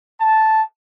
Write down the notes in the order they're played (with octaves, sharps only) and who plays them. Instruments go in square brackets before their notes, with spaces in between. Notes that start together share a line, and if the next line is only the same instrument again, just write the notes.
[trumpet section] A5